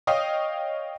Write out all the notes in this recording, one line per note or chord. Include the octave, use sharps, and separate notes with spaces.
C#5 D#5 F5 G5 D#6